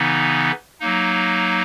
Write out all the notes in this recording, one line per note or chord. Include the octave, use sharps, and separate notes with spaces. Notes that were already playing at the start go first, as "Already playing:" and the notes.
Already playing: C#3 E3 B3 D#4
F#3 A#3 D#4